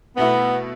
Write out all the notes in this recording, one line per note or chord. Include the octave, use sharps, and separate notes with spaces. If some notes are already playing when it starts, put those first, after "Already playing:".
B2 A3 B3 E4